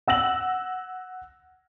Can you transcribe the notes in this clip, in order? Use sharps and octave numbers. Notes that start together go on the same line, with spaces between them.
F#5 E6 A#6 F#7